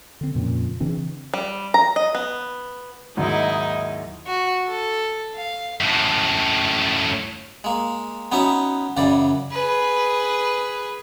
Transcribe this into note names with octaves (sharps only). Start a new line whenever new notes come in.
D3 C4
F2 A#2 C#3 C4
C#3 E3 C4 D4
G3
A#5
D#5
B3
D#2 G#2 F#3 D#4 E4 D#5
F#4
A4
F5
F#2 A2
G#3 A#3
B3 C#4 D#4 F#4 E5
F#2 C#3 E3 D5
G#4 B4